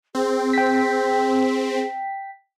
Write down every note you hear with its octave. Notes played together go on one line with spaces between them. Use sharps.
C4 G#4
G5 B6